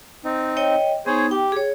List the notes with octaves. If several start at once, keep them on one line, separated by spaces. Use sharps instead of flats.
C4 D#4
C#5 D#5 G5
B3 D#4 G#4 C5 C#5
G4 G5
G#4 C#5